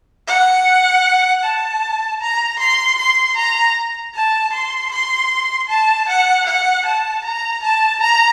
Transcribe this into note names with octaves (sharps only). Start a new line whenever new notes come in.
F#5
A5
A#5
C6
C6
A#5
A5
C6
C6
A5
F#5
F#5
A5
A#5
A5
A#5